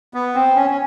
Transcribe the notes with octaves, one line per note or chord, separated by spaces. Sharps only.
B3
C4
C#4
C#4